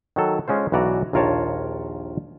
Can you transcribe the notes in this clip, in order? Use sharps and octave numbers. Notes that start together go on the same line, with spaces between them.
D#3 F#3 A4
G#3 C#4 F4 C5
B1 E3 F#4 D5 A#5
A#1 D#2 F4 A#4 C#5 A5